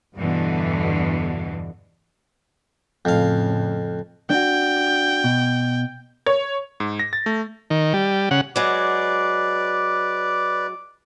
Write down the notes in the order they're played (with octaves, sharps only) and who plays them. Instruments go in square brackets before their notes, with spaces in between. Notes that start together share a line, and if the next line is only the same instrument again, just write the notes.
[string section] E2 G2 B2 D3 E3
[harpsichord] F2 F5 [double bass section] A2 C#3
[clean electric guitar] D4 F#4 [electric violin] G5
[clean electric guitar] B2
[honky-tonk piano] C#5
[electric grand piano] G#2
A#6
A6
A3
[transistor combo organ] D#3
G3
C#3 F#5
[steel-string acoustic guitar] F#3 G#3 [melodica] B4 D5 [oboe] D6